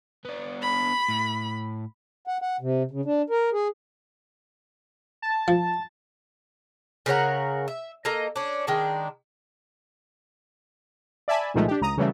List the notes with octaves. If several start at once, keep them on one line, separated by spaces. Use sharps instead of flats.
B3 D4
B5
A2
F#5
F#5
C3
C#3
D4
A#4
G#4
A5
F3
C#3 A#4 C#5 F#5
E5
A#3 A4 D#5 A#5
C#4 D4
D#3 G#3 D4
D5 E5 G#5 A5 B5
C2 A#2 D#3 F3 G#3 A3
D4 G4
C#2 A#5 D#6
C#3 E3 F#3 G3 A3